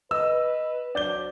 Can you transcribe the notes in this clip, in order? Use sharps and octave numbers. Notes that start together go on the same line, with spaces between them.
B4 D#5 E6
F#3 D4 C5 D5 G6 G7